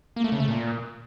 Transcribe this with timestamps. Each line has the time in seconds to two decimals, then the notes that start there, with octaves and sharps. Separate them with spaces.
0.16 A#3
0.24 A3
0.32 C#3
0.40 A3
0.48 A#2